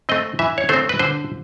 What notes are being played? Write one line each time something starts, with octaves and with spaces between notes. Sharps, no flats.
A3 C4 D#5
E3 E5
C#5
A3 C4 C5
B4
D3 C5